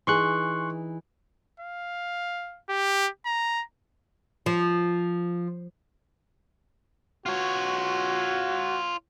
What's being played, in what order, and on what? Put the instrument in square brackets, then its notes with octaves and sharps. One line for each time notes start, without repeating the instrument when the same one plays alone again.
[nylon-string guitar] E3 D#4 G#4 [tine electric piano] C6 C#6 F#6
[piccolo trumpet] F5
G4
A#5
[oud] F3
[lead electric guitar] F4 C#5 [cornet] F#4